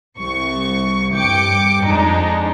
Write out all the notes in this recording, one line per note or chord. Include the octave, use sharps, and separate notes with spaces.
C2 C#6
G2 G5 D6 C#7
F2 G#3 D4 D#4